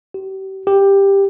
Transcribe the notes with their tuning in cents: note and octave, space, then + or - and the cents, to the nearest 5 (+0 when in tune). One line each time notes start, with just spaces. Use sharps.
G4 -35
G4 +10